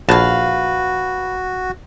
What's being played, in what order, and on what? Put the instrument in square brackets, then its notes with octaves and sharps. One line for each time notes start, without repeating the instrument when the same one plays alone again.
[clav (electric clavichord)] A#1 A5 [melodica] F#4 [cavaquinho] B4 F5